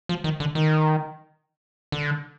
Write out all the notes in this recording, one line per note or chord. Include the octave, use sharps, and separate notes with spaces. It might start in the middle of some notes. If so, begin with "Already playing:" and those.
F3
D#3
D3
D#3
D3